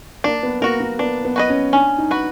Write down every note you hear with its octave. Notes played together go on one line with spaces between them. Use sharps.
A#3 D4
B3
A#3 F#4 A#4
A#3
B3 D4
B3
F#4 B4 D#5
C#4
C#4 D4
D#4
F#4 B4